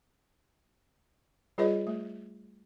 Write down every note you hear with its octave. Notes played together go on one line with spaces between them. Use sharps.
G3 F4 G#4 B4 C#5 D#5
A3